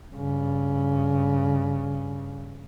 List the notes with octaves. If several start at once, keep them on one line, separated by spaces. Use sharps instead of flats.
G2 C#3